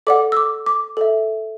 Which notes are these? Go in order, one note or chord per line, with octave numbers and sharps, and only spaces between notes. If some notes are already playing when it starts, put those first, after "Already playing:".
A4 D5 F#5 D6
E6
D6
D6
A4 E5